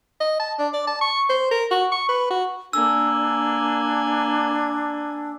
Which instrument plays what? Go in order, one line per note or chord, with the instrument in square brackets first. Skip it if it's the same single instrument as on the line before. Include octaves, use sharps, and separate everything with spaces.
[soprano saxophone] D#5
A5
D4
D5
A5
C#6
C5
A#4
F#4
C#6
B4
F#4
[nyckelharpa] A#3 G#5 [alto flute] D4 [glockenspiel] E6